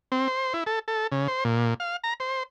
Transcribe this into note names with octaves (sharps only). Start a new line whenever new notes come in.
C4
C5
E4
A4
A4
C#3
C5
A#2
F5
A#5
C5